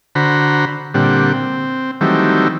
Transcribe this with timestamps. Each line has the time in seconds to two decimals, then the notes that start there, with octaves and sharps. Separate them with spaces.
0.15 D3 F#4 C5 A#5 B5
0.94 A#2 D3 G3 C4 F#5
1.33 C4
2.01 D#3 E3 F#3 G3 A3 C4